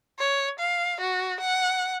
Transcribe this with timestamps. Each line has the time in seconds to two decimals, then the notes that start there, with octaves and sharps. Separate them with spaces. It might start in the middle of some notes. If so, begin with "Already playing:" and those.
0.19 C#5
0.59 F5
1.00 F#4
1.41 F#5